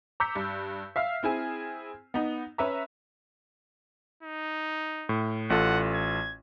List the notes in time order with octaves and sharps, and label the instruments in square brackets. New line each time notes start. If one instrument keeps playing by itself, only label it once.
[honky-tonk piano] A#5 D6 E6 G6 B6 C#7
G2
E5 F5 F6 C7
C4 E4 G#4 G#5
B3 D#4
C#4 B4 E5 A#5
[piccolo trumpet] D#4
[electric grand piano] A2
[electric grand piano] A1 F4 A4 [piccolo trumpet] F#5
[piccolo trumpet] G#6